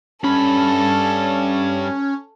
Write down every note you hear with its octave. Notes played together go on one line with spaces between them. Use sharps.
G2 C#4 A4 B5